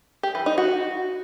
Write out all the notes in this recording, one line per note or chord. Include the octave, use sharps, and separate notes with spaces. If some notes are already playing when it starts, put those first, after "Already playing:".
G4
E3
D#4
F#4